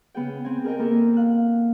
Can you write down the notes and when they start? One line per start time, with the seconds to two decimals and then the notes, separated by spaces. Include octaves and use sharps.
0.15 C#3 B3 G#4 G5
0.45 C4 G#5
0.64 G#4 A#4 D#5 G5
0.79 A#3 B3 A4 A#4 D#5 E5
1.16 F5 F#6